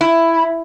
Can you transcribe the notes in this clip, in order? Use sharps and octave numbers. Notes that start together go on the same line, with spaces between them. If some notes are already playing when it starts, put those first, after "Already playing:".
E4